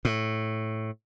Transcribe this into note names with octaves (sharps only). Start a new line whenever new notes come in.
A2